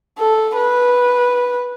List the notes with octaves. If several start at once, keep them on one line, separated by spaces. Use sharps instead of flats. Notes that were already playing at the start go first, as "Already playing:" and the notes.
A4
B4